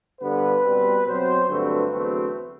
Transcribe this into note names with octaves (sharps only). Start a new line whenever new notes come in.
G2 D3 G3 B3 B4
B2 G3 C4
B2 F#3 C4 C5
G2 D3 F#3 A3 C4 B4
E2 D3 F#3 A3 C4